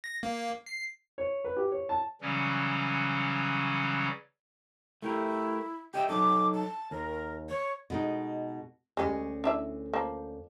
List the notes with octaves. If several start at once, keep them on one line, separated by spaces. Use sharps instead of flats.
A#6
A#3
C7
C#5
B4
G4
C#5
A5
C#3 E3 F#3 G3 C#4
A3 E4 G4 A#4
G4 D#5 E5 G5
F#3 D#4 A4 D6
A5
D#2 A#4
C#5
B2 G#3 D#4
D2 G3 G#3 C#4 G#4
D4 E4 E5
F3 A#3